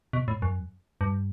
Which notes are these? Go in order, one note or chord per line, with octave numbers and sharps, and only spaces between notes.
B2
A2
F#2
G2